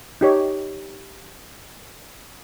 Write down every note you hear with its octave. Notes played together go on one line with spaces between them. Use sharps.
D#4 G4 C#5